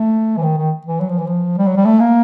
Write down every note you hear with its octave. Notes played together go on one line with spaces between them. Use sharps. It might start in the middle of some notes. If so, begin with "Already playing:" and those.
Already playing: A3
E3
D#3
D#3
E3
F#3
F3
E3
F3
G3
F#3
G3
A3
A#3